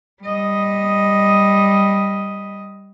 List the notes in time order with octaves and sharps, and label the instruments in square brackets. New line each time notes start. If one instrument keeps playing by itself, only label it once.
[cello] G3 D#5